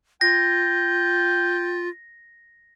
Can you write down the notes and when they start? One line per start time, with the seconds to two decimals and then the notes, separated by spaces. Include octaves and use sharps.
0.21 F4 G5 A#6